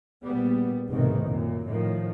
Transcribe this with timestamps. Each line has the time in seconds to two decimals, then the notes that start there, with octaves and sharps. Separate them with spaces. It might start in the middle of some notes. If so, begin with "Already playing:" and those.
0.25 A#1 G3 B3
0.89 F1 C2 G#2 B2 D#3 E3
1.24 F#2 A#2
1.67 A2 D#3 F3